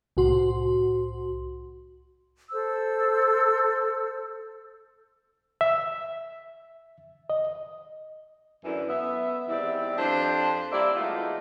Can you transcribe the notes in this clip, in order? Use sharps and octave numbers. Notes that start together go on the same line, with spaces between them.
C2 A2 F#4 C6
A4 C5 E6
E5
D#5
F#2 D3 E3
B3 E5
E2 D#3 G3 C4 E4 D5
F2 D4 G4 C5
G3 A#3 C4 E4 D5 E5
B2 D#3 G#3 A3 E4 F4